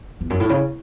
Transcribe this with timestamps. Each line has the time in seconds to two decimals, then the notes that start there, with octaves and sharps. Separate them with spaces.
0.21 E2
0.30 F#2
0.40 A2
0.49 C#3